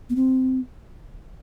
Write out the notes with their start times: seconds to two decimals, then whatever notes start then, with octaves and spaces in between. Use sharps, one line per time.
0.10 B3
0.16 C4